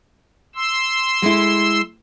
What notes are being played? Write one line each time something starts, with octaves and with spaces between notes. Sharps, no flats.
C6 E6
G#3 A3 E4